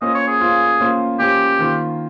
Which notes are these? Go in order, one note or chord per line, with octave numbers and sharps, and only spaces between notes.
A#3 C#4 F4 C5 D#5
C#5
G#4
A#3 C#4 F4 C5
A#3 C#4 F4 C5
A#3 C#4 F4 G4 C5
D#3 A#3 F4 C5